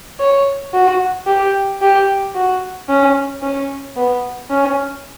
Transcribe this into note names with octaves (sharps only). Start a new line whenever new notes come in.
C#5
F#4
G4
G4
F#4
C#4
C#4
B3
C#4